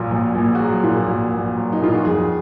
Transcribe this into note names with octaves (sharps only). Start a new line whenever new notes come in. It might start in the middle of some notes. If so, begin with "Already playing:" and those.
Already playing: A#1 A#2 F#3
A#1
A#1
F#4
F#3 G#4
A#2
A#1
A#1
F#3
D#4
A#2 F4
F#4
F2 G#4